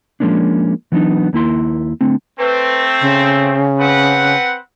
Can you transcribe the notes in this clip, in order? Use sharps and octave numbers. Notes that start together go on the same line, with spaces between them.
F3 G#3 A#3 C#4 D4
E3 F#3 B3 D4 D#4
D#2 A#3 E4 C6
D3 A3 C4
A3 C4 B4
C#3
C4 B4 F#5